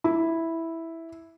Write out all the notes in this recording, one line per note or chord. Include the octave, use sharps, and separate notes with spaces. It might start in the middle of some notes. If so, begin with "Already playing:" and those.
E4